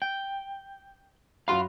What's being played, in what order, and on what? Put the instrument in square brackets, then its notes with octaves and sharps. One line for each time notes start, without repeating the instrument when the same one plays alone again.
[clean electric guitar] G5
[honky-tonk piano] F#2 F#4 B5 [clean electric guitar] F5 C6